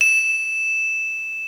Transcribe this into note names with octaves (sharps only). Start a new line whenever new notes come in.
E7